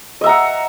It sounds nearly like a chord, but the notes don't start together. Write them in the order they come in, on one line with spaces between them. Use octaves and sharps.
D#5 E5 A#5 F#5